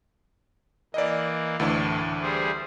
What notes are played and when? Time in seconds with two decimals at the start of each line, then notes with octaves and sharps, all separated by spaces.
0.94 E3 A#3 D5 D#5
1.60 D2 A2 E3 D4
2.22 G3 G#4 C5